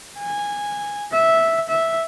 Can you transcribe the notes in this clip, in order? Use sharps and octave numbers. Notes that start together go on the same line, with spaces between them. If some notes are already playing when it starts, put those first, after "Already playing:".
G#5
E5
E5